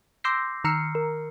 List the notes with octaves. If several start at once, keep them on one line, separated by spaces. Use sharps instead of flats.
C6 D6 E6 G6 A#6 C7
D#3 A#5 E6 F6 C7 C#7
A#4